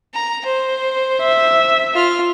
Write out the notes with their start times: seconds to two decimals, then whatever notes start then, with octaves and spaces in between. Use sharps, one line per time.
0.14 A#5
0.45 C5
1.22 E5
1.94 F4 F6